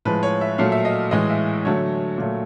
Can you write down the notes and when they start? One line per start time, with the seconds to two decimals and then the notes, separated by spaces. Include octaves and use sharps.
0.05 A2 F3 G#3 B4
0.23 C#5
0.41 E5
0.58 A#2 F#3 A3 F5
0.72 E5
0.85 D#5
1.11 A2 E3 G#3 D#5
1.30 E5
1.65 D3 F#3 A3 C#5
2.18 A#2 F#3 A3